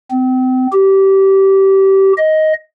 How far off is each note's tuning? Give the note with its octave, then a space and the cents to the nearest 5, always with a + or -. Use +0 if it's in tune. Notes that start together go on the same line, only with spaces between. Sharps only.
C4 -30
G4 -20
D#5 +10